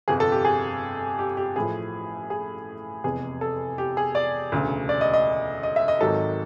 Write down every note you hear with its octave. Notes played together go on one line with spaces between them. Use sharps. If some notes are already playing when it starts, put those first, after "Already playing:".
G1 F2 C3 G#4
A4
G4
G#4
G4
G4
A1 A2 F3 G#4
G#4
F1 E2 C3 G#4
A4
G4
G#4
D5
E1 D2 C#3
D5
D#5
D#5
D#5
E5
D#5
G#1 G#2 D#3 F#3 A4